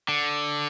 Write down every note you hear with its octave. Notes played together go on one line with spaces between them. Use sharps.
D3